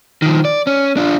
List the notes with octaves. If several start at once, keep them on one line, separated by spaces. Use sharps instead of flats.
D#3 F3
D5
C#4
D4 F4